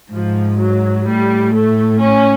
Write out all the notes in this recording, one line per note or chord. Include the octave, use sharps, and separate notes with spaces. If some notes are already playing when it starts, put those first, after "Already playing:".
G#2 F3
F#3
A2 G3
A3
C#4